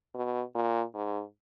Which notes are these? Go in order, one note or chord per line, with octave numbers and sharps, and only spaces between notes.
B2
A#2
G#2